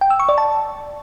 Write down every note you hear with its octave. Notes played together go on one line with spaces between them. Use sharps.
G5
E6
C#6
D5
A5